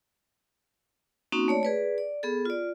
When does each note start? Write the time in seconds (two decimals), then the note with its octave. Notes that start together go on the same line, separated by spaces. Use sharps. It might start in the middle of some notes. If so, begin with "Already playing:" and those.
1.32 A#3 C4 C#4 D#4 F#4
1.48 A3 C#5 D5
1.63 G#4 B4 D5
1.98 D5
2.23 B3 G#4 A4
2.45 F4 D5